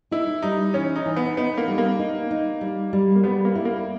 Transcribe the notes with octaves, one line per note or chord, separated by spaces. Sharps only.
D#4 E4
G3 D#4
E3 C#4
D#4
E3
B3
B3 D#4
A#3
G3
A#3
D#4
D#4
G3
G3
A#3
G3 B3
A#3
E4
A#3